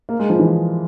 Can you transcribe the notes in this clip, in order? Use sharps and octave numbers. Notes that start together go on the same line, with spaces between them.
A#3
G#3
F3
E3